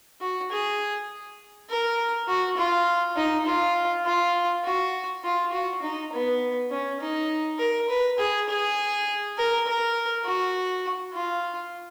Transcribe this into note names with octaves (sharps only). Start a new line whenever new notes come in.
F#4
G#4
A#4
F#4
F4
D#4
F4
F4
F#4
F4
F#4
D#4
B3
C#4
D#4
A#4
B4
G#4
G#4
A#4
A#4
F#4
F4